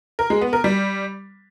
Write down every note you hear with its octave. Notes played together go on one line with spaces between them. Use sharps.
A#4
G#3
B3
A#4
G3